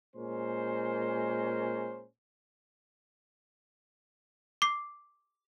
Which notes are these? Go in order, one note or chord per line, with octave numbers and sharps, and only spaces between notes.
A#2 G#3 C#4 A#4 C5
D6 C7